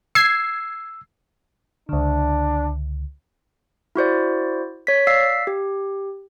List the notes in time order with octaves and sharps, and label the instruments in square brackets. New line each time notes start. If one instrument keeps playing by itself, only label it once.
[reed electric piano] E6 [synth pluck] G#6 C7
[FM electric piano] C#2 D3 [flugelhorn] D4
[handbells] E4 F#4 C5 D5
C#5 B6
D5 F5 E6 B6 C7
G4